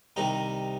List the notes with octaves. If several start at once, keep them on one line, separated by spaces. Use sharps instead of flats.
C2 C3 D#3 D#4